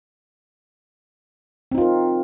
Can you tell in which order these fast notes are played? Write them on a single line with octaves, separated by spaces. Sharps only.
C4 D#4 F4 A#4